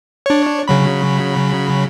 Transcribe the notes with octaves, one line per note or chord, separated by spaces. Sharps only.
D4 C#5
C#3 F#3 B5